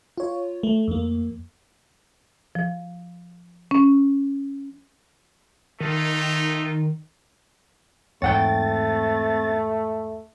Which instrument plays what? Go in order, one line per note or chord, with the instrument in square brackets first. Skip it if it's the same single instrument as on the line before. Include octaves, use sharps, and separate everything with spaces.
[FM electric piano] F4 C#5
A3
F2 A#3
[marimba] F3
C#4
[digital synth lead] D#3 [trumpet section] A3 D#4 F4
[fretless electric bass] E2 G#2 [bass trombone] A3 [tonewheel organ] C4 A6 [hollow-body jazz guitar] C#5 F#5 G5